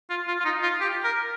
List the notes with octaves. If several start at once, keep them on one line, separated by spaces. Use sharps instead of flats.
F4
F4
F4
D#4
F4
G4
A#4